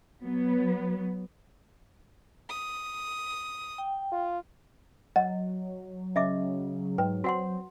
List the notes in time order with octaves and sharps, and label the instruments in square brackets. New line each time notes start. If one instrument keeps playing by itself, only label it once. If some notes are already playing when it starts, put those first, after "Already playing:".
[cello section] F#3 B3
[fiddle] D#6
[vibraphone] G5
[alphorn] F4
[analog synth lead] F#3 [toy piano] D#5 [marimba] F#5
[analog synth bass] C#3 [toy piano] D#5 E5 D6
[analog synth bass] G#2 [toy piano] B4 [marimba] G5
[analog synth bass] C4 [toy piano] F#4 F#5 C6